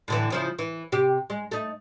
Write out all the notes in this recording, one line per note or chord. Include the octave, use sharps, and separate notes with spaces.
A2 D3 E3
C#3 F3 E4
E3
C3 G4
G#3
A3 D#4